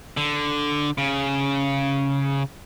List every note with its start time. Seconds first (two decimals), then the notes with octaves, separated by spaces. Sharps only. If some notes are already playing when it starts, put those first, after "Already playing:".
0.17 D3
0.98 C#3